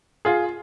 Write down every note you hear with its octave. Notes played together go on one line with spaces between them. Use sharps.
F4 G#4